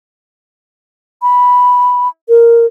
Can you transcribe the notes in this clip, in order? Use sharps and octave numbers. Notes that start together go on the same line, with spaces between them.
B5
A#4